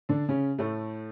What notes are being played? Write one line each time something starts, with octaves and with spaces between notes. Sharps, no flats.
D3 D4
C#3 C#4
A2 A3